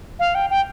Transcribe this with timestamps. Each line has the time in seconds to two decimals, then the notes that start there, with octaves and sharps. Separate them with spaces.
0.19 F5
0.35 G5
0.50 G5